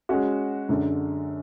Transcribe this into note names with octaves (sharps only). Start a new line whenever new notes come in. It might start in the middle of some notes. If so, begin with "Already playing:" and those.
G#3 C#4 F#4
F#2 D3 G#3 D4